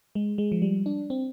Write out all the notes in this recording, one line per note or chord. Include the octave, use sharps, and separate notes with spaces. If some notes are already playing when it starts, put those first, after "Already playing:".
G#3
G#3
F3
G3
D4
C4